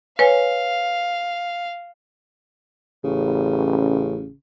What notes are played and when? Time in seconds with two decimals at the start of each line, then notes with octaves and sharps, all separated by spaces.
0.19 B4 C#5 F5 G#5
3.04 A1 C#3